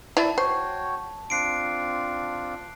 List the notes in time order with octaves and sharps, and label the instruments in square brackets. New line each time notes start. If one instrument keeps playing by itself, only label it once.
[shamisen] E4 D5 E5 [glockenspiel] A5
[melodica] F#4 C#5 G5 [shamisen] C5
[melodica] C4 D4 F4 [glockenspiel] F#6 C7 D7